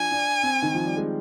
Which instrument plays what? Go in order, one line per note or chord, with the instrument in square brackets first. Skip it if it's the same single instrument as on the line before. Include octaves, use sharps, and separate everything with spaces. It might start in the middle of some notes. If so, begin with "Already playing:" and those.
Already playing: [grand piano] F3 D4 [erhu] G#5
[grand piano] D4
C4
D#3
F3
G3
G#3